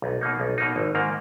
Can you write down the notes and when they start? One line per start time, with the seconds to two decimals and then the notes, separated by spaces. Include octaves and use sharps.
0.02 B1
0.21 B2 A#3 D#4
0.40 B1
0.58 B2 A#3 D#4
0.76 G#1
0.95 G#2 D#3 A#3